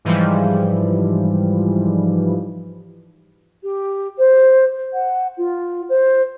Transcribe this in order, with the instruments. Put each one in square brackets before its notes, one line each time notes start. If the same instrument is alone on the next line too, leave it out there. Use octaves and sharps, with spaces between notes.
[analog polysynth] G#2 E3 F3 G3
[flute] G4
C5
F#5
F4
C5